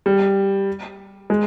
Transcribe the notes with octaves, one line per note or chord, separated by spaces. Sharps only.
G3
G#3